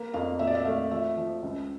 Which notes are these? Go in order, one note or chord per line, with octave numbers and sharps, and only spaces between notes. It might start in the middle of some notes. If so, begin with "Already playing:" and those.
Already playing: A#3
F2 F5
A#2 E5
D5
E5
A3 F5
F3 E5
F3
C#2